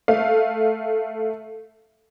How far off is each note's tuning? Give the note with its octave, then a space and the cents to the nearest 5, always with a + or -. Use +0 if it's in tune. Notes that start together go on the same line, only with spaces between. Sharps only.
A3 +0 F5 +0